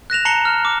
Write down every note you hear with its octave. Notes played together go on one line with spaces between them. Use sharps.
F#6 A#6 E7 F7
A5 A#5 C7 C#7 F#7 G7
F6
D6